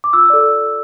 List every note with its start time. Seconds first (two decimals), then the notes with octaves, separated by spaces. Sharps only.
0.04 D6
0.13 F4 E6
0.30 A4 D5